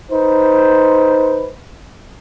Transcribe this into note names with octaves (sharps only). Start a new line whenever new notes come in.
D#4 B4 C5